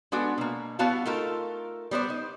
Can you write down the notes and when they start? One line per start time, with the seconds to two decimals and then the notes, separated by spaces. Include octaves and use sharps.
0.12 G#3 B3 D4 F#4 A4
0.38 B2 A#3
0.79 G3 B3 E4 F#4 F5 A5
1.05 A3 D#4 F4 A4 A#4
1.91 G3 B3 C5 D5
2.08 D#4 C5